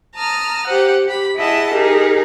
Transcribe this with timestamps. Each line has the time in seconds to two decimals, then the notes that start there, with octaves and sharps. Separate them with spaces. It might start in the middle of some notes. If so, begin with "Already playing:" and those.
0.14 A5 A#5 D#6 F6
0.66 G4 C5 F#5
1.06 G4 B5
1.36 E4 G#4 D#5 E5 F#5 A5
1.72 D#4 G4 G#4 A#4